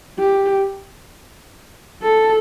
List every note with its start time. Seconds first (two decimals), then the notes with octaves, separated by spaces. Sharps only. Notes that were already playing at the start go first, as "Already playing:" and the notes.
0.19 G4
2.03 A4